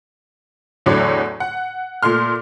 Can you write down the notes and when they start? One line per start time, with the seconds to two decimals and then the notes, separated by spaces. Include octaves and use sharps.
0.86 E2 A2 D3 F#3 C#5 D5
1.40 F#5
2.03 A#2 A3 C6 F6